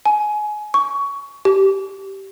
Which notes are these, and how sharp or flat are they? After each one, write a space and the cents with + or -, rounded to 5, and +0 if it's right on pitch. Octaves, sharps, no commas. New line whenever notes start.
G#5 +25
C#6 +20
G4 -15